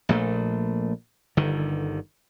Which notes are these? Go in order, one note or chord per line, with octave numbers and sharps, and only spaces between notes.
A#1 A#2 A3
G1 D3 D#3